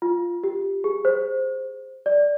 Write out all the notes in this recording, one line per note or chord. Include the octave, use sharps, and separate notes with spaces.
F4
G4
G#4
C5
D5